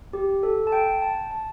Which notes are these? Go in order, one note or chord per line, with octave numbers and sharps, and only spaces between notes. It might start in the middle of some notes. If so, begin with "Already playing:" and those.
G4
A4
A5
G5
A5
A5